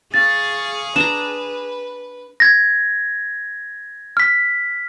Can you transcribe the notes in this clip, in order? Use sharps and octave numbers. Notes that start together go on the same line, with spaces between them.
G#4 F5 C#6 A6
D4 B4 A#5 E7
G#6 A#6
F6 B6